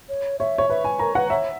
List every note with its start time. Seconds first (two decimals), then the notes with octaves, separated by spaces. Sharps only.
0.09 C#5
0.39 C#5 E5
0.58 C#5
0.70 B4 E5
0.84 G#5
0.99 A#4 A#5
1.15 B4 F#5
1.30 C#5 E5